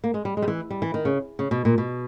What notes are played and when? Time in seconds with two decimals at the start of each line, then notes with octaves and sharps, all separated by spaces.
0.04 A#3
0.14 G#3
0.25 G3
0.37 G#3
0.42 G3
0.48 E3
0.70 G3
0.82 E3
0.94 D#3
1.05 C#3
1.39 C#3
1.51 B2
1.65 A#2
1.78 B2